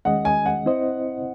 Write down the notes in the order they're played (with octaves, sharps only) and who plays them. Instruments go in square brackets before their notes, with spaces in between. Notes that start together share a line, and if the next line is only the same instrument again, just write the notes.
[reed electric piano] D#3 G#3 C#4 G#4 D#5 [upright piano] F#5
[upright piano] G#5
F#5
[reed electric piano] C4 E4 C5 D#5